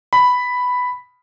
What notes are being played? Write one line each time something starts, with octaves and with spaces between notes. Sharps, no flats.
B5